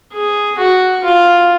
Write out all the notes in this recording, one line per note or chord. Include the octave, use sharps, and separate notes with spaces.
G#4
F#4
F4